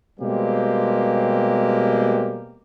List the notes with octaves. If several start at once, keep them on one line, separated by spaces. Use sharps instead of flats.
B2 G3 G#3 A#3 C4 G4